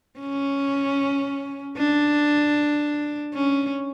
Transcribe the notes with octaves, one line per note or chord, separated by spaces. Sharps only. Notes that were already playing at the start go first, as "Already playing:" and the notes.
C#4
D4
C#4